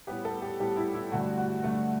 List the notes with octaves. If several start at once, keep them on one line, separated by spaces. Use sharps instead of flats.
A2 G3 B3 G4
A4
G4
A2 G3 B3 G4
E4
E4
G2 D3 A3 F#4
F#4
G2 D3 A3